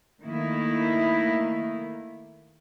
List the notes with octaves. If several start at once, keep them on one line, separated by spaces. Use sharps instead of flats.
D#3 A3 A#3 E4